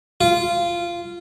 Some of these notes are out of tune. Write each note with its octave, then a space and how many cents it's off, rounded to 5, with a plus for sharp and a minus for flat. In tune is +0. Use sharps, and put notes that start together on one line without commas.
F4 -15